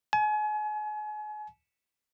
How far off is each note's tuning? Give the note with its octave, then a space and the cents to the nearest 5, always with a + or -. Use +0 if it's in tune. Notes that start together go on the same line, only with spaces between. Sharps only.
G#5 +35